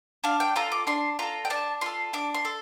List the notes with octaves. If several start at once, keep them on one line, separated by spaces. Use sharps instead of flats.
D4 F5
G5
F4 A4 A#5
D6
D4 C6
F4 A4 A#5
G5
D4 A5
F4 A4 C6
D4 D6
C6
A4